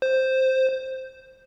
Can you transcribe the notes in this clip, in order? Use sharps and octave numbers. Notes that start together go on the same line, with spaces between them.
C5